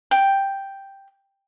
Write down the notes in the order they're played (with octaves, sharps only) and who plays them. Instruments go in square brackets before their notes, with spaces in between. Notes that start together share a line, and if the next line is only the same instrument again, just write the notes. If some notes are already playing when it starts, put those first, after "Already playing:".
[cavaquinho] G5